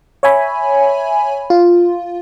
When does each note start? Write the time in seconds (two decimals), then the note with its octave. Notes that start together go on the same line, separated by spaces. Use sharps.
0.23 C#5 E5 G#5 B5
1.50 F4